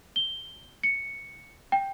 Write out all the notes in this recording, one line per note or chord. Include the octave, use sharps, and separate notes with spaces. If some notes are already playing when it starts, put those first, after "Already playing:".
G7
C#7
G5